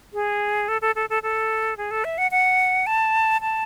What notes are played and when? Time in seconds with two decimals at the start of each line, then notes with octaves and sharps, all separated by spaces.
0.13 G#4
0.68 A4
0.81 A4
0.95 A4
1.10 A4
1.23 A4
1.77 G#4
1.91 A4
2.04 E5
2.18 F#5
2.31 F#5
2.86 A5
3.41 A5